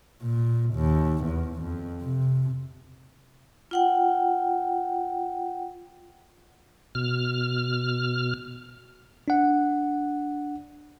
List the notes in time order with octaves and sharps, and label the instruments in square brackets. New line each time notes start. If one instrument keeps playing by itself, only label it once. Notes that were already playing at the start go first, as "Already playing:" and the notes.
[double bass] A#2
D#2
E2
F2
C3
[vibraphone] F4 F#5 G5
[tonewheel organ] B2 F6
[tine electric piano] D4 F#5